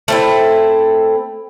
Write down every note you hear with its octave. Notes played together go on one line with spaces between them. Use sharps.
A3 C4 E4